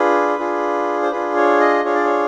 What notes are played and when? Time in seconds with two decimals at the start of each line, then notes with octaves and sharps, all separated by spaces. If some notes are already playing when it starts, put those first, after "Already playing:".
Already playing: D4 F4 G#4 B4
0.39 D4 F4 G#4
1.02 C5
1.11 D4 F4 G#4 B4
1.37 C#5
1.60 D#5
1.85 D4 F4 G#4 C#5
1.95 D5
2.05 C#5